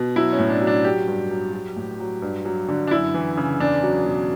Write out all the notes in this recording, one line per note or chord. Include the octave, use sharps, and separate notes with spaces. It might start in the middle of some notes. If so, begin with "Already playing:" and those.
Already playing: B2
F#3 E4
C#4
A2
D4
F#3
D4
F#3 G4
G2
F#3
F#3
A2
F#3
G2
F#3
D3
D4
F#2 E4
E3
C#3
E2 D4
F#3
B2